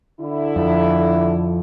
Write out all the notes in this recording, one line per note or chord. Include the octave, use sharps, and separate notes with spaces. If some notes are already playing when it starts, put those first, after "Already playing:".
D3 E4
F2